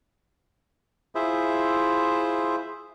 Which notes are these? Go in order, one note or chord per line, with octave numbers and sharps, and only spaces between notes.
E4 F4 G#4 C5 E5